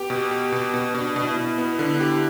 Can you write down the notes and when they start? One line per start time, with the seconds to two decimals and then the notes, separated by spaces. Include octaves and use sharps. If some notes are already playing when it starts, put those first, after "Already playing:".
Already playing: B3 G4
0.10 B2
0.31 G4
0.52 B2
0.74 B2
0.94 B2 D4
1.16 B2
1.27 E4
1.37 B2
1.58 B3
1.79 D3
2.00 G4